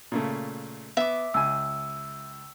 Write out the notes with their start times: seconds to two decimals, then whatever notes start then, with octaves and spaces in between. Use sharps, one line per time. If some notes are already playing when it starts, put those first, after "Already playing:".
0.12 A#2 C#3 A3
0.97 B3 E5 D6
1.34 C#2 G#5 E6